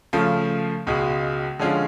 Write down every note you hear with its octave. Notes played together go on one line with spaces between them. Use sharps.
C#3 F3 A3 F4
C#2 B2 G#3
D3 F3 G#3 C#4 F4